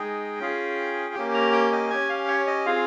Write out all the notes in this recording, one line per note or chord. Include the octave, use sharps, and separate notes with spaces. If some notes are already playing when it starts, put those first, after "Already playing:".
Already playing: G#3 D#4 G#4 G5
C#4 F4 G#4
A#3 C#4 G4
A#5
G5
D#5
C#4 G4 G#5
F5
C#5
D#5
C4 F4 G#4 F5